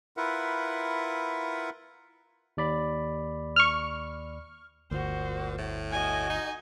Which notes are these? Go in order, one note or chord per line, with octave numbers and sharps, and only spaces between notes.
E4 F4 A#4 B4 E5 F#5
D#2 D5 B5
C#6 F6
G1 D2 A#2 F#4 C5
A2
F#4 D#5 G#5
D#4